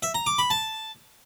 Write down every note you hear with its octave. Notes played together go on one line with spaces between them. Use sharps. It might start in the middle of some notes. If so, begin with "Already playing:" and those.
E5
A#5
D6
B5
A5